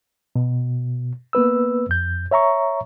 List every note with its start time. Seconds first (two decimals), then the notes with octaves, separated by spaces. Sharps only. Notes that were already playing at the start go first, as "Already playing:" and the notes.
0.36 B2
1.33 A#3 B3 B4 E6
1.89 F2 G6
2.31 C#5 E5 A#5 C#6